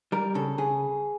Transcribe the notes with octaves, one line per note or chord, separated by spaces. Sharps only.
G3 A#4
C#3 A4
C#3 G#4